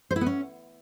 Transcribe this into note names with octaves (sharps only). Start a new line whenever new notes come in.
C5
E4
B3
C#4